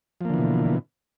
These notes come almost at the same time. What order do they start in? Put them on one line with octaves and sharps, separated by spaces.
F3 A#3 D3 E3 B2